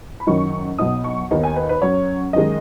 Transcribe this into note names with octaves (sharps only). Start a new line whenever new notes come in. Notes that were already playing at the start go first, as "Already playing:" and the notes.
B5
F#1 F#2 D#3 F#3 D#4 C#6
B1 B2 B3 D#4 D#6
C#6
D#2 D#3 B3 D#4
G#5
B4
B4
F#2 F#3 C#4 C#5
F#2 D#3 G#3 D#5